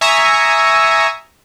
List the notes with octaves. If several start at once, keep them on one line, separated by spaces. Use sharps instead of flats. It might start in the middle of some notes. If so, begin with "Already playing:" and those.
E5 G#5 A#5 C#6 D#6